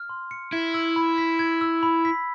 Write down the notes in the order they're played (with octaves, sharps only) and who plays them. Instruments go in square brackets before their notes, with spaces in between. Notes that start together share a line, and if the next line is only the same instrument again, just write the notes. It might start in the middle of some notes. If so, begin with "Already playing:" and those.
Already playing: [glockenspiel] F6
C6
C#7
[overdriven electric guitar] E4 [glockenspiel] G#6
[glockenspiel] E6
B5
B6
G#6
E6
B5
B6